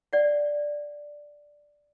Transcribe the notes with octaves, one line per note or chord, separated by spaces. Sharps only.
D5 F#5